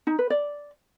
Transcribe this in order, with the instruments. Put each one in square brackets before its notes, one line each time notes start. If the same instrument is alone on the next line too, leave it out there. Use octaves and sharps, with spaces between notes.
[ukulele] D#4
B4
D5